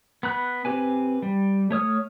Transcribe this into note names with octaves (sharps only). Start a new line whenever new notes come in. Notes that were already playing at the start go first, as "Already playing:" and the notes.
B3 B5 F#6
C4 G4 B4 G#5
G3
A3 C#5 D#6 F6